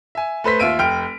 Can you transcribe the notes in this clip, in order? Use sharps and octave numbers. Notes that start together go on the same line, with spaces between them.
E5 G#5
A3 B4 C5 B6
D#2 F4 E5 D7 D#7
F1 G5 F6 D7